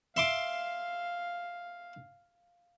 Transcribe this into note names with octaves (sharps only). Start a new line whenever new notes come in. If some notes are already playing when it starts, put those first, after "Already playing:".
E5 F5 C6 D6